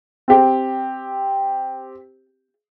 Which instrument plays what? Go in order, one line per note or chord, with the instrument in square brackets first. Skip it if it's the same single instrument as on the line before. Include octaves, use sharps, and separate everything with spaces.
[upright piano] C4 G4